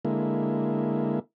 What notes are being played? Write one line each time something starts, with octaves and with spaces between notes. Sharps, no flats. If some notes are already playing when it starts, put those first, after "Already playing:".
D3 G#3 A#3 E4